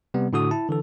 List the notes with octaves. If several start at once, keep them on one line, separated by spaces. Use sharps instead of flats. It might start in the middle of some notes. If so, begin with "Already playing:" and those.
C3 G3 B3
A2 D3 F#4 D#6
E4 A5
D3 E3 A4